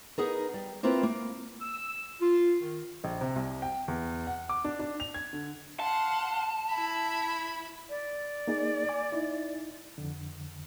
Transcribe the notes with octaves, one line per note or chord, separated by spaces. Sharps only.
B3 D#4 G#4 A#4
G3
A#3 C4 E4 F4 A#4 B4
A#3
E6
F4
D#3
A#1
C3
C2
G5
E2
F#5
D6
D4
D4
F7
G#6
D3
F5 F#5 A5 C6
E4 E5 B5
D5
A#3 D#4 G#4
G#5 D6
D#4 E4
F2 D3